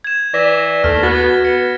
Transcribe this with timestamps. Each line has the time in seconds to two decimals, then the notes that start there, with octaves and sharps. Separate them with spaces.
0.04 G#6 E7
0.34 E3 D5 A#6 B6
0.84 D#2 A3 F6
1.03 B3 F#4 A6
1.45 B3 C#7